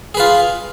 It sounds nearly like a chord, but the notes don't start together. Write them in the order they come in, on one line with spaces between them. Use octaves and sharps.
G#4 B4 F4